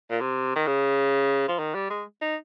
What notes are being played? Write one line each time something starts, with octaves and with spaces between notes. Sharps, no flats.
A#2
C3
D#3
C#3
F3
D#3
G3
G#3
D#4